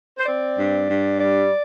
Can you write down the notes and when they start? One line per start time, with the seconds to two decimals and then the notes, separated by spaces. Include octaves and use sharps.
0.18 C5
0.26 C4 D5
0.58 G2
0.89 G2
1.20 G3 D5